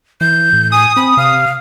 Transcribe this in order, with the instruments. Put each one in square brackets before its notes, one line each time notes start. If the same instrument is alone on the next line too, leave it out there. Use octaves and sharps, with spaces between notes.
[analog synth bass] E3 [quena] G6
[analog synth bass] A2
[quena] G#5 [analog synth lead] D#6
[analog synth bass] C4 [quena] B5
[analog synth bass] C3 [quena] F5